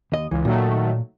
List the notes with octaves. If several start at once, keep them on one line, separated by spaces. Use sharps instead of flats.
D#2 D#5
C#2 E3
A#2 D#3 F#3 A3